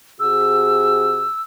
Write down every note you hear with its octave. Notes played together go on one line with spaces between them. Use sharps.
C3 F#4 G#4 E6